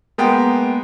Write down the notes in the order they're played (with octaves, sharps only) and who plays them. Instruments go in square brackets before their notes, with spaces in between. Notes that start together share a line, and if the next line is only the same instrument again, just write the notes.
[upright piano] G#3 A#3 B3 G5